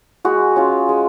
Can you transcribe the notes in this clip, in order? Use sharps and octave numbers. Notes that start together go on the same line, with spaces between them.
G#3 F#4
C#4 F4
G#3